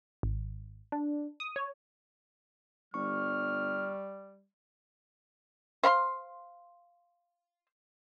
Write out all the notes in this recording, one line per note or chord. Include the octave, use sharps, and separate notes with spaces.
G#1
D4
D#6
C#5
G1 G3 C#6 F6
C5 F5 B5 C6